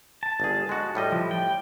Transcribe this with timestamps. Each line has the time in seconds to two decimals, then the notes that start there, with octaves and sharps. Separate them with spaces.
0.23 A5
0.40 G1 G#4
0.69 G#3 F#4
0.95 A2 G3 D#5
1.12 F3
1.31 G5